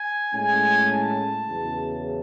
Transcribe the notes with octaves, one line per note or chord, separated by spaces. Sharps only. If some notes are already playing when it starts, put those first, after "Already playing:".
Already playing: G#5
A2 G#3 C#4 G#5
A5
E2 C#3 F#3